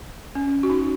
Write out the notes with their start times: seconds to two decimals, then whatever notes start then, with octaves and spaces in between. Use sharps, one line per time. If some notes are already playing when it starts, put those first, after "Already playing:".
0.35 C#4
0.63 F#4
0.70 D#4